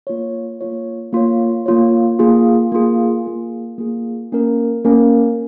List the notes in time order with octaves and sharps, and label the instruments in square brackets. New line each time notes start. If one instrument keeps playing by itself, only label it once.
[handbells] A#3 F4 C#5
A#3 F4 C#5
A#3 F4 C#5
A#3 F4 C#5
A#3 F4 G#4
A#3 F4 G#4
A#3 F4 G#4
A#3 F4 G#4
A#3 C#4 A#4
A#3 C#4 A#4